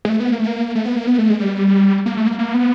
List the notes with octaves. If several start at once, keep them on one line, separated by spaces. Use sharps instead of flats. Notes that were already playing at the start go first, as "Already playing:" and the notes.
G#3
A3
B3
A#3
A3
A#3
A3
B3
A#3
B3
A3
G#3
G3
A#3
A3
A#3
A#3
B3